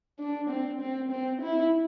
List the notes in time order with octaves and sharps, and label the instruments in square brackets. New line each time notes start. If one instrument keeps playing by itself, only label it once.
[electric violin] D4
C4
C4
C4
E4